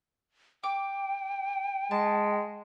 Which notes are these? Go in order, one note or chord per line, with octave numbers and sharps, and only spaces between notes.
G5 D6
G#3 A5